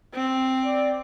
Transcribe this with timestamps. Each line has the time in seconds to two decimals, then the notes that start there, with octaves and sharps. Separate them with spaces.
0.14 C4
0.65 D5